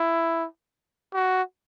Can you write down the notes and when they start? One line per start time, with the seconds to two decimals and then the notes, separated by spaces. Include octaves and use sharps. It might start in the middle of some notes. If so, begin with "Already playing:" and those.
Already playing: E4
1.14 F#4